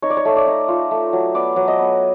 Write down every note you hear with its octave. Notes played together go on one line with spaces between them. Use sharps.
D#4 C#5
D5
C#5
A3
D5
D#4
F4
A3
F#3
B3 D5
F#3
D#5
B3